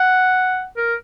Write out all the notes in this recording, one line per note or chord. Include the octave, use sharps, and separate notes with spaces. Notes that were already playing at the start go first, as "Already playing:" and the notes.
Already playing: F#5
A#4